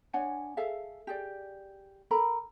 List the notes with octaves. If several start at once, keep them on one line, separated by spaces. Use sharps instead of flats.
D4 C#5 F#5 G#5
G#4 A4 E5 F5
G4 G#4 D5
A4 A#4 A#5 B5